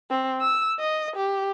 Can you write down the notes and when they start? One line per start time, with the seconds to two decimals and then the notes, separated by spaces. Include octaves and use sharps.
0.11 C4
0.41 E6
0.79 D#5
1.16 G4